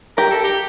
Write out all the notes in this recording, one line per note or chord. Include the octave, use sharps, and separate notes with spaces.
G4 A#4
A4
G4